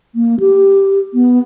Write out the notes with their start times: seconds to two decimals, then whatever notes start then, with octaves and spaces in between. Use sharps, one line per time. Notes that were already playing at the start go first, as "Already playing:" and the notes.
0.15 A#3
0.40 G4
1.14 B3